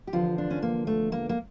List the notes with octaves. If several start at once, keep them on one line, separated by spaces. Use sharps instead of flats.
G4
E2 D3 F3 F4
D4
C#4
A#3
A3
A#3
A#3